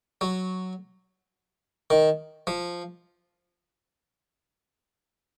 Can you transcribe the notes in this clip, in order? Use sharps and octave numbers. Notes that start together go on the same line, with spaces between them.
F#3
D#3
F3